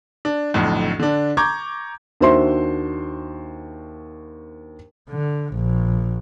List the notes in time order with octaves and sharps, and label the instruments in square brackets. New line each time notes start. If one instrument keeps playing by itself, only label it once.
[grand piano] D4
B1 F2 A2 D3
D3 D4
A#5 C#6 D6 G6 G#6
[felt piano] D#2 D4 F#4 C5 E5 C6
[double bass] D3
A#1